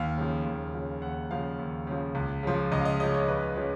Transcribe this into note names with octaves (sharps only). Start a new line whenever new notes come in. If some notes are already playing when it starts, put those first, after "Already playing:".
Already playing: D#2 F5
C#3 F3
D#2
C#3 F3
D#2 F#5
C#3 F3 F5
D#2
C#3 F3
C#2
C#3 F3
C#2 D#5
F5
D#5
C#3 F3 D#5
C#5
C#2 B4
C#3 F3 C#5